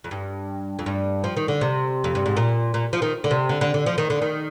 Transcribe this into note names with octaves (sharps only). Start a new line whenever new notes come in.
F2
G2
F2
G2
F3
D#3
D3
C3
F2
G2
G#2
A#2
A#2
F3
D#3
D3
C3
D3
D3
D3
F3
D#3
D3
D#3